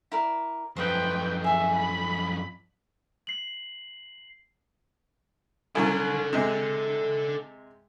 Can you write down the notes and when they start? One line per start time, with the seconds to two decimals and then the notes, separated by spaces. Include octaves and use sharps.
0.12 E4 A#4 D5
0.76 F#2 F3 B4 C5 G5 C6 D#6
1.44 G#4 E5 G#5
1.76 B5
3.27 C7 F#7
5.75 C2 F#3 C#4 A4 F#5
6.33 C3 G#3